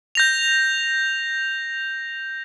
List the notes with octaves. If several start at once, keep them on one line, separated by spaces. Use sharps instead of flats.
G6 A#6 F7